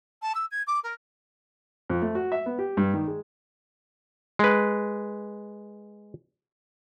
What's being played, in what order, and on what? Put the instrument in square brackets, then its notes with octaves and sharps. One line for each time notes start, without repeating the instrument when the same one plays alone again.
[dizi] A5
E6
G#6
D6
A#4
[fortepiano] F2
A3
F#4
E5
B3
G4
G2
D#3
G#3
[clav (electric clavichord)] G#3 B4